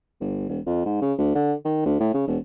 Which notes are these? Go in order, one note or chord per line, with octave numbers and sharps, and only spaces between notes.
G1
E1
F2
G#2
C#3
D2
D3
D#3
D2
A2
C#3
E1